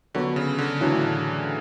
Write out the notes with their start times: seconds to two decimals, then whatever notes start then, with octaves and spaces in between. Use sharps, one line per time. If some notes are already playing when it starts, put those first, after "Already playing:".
0.15 D3 F#3 B3 F#4
0.36 C#3
0.58 D3
0.80 A2 E3 F#3 A3 D4